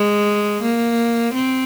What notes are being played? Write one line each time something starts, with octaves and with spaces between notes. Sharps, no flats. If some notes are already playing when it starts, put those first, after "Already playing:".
Already playing: G#3
A#3
C4